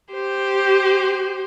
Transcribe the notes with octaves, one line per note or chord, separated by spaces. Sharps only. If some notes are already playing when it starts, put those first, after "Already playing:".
G4 C5